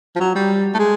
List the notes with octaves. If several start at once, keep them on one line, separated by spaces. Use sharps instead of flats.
F3
F#3
G3
A3
G#3